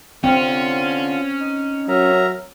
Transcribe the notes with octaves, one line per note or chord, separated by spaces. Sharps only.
D3 C4 C#4 F4
D#4
F#3 A#4 E5 A#5